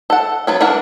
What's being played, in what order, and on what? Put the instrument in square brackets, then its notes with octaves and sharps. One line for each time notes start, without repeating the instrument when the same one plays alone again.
[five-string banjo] A4 F#5
F#3 B3 C#4
E3 D4 A#4 F#5